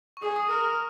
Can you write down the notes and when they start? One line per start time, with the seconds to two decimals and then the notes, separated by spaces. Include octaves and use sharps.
0.17 C#6
0.22 G#4 D#6
0.36 D#6
0.50 A#4 F6